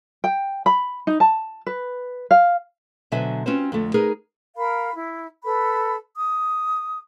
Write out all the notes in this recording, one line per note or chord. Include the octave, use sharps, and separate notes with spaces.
G5
B5
D#4
A5
B4
F5
B2 D3 F#3 C5 E5 G#5
C4 C#4 F4 F#4 B4 C5
F2 D3 A3
D#4 G#4 A#4 B4
A#4 F5 B5
E4
A4 B4 B5
D#6